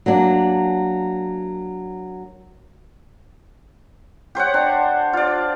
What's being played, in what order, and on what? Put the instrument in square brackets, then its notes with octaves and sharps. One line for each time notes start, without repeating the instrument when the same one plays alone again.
[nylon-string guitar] F#3 A#3 D4
[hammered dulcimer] G4 C5 C#5 F#5
D4
F4 D5